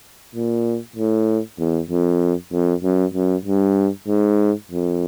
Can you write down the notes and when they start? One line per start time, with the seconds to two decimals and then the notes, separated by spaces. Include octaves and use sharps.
0.35 A#2
0.96 A2
1.59 E2
1.90 F2
2.52 F2
2.83 F#2
3.14 F#2
3.45 G2
4.08 G#2
4.71 F2